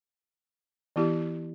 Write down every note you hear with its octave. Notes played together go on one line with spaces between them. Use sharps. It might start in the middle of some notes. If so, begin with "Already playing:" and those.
E3 B3 E4 G4